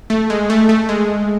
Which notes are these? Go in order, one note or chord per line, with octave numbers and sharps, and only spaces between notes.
A3
G#3
A3
A3
G#3